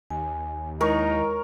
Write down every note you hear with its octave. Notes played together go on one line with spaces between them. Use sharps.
D#2 G#5
G#3 D#4 E4 A#4 C#5